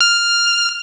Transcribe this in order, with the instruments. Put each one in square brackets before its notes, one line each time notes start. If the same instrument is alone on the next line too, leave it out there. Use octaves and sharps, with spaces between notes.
[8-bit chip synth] F6